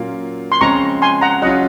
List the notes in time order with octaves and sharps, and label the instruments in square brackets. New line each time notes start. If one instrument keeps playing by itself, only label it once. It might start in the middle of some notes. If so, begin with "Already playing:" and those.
Already playing: [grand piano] A#2 F#3 A#3 C#4 F4
[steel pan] C6
[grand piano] C#3 F3 G#3 C4 [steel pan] A#5 C#6
[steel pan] G#5 C6
F#5 A#5
[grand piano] F#3 C#4 F4 [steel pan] D#5 F#5